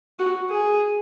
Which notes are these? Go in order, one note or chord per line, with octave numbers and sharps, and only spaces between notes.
F#4
G#4